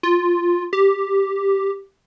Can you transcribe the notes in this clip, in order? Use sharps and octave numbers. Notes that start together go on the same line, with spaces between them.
F4
G4